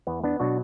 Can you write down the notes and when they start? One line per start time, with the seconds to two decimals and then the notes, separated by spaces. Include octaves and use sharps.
0.07 E2 B3
0.24 B3 D4
0.40 B2 F#3 D4 F#4